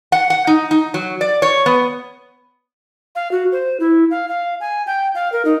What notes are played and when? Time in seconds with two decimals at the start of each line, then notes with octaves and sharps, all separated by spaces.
0.12 F#5
0.30 F#5
0.47 D#4
0.71 D#4
0.94 F#3
1.21 D5
1.42 C#5
1.66 B3
3.15 F5
3.32 F#4
3.52 C5
3.80 E4
4.11 F5
4.28 F5
4.60 G#5
4.86 G5
5.15 F5
5.32 A#4
5.45 D#4